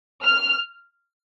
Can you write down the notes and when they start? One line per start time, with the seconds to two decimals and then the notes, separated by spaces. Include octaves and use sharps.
0.23 F6